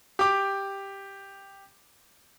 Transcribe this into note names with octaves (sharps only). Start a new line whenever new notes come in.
G4 D6